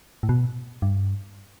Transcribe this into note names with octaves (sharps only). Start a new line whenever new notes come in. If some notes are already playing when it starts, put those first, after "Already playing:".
A2
B2
G2